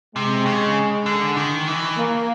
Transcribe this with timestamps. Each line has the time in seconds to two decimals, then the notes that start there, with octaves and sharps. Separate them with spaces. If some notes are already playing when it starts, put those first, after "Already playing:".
0.15 C3 G#3
0.46 C#3
1.06 D3
1.37 D#3
1.67 E3
1.97 A#3